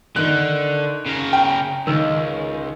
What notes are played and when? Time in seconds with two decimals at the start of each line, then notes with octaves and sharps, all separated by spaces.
0.16 D3 D#3 F#6
1.06 C#3 A#4
1.33 G5
1.87 C#2 D#3 E6